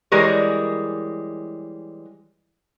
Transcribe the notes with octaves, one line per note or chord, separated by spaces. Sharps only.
E3 G3 G#3 A#4 C#5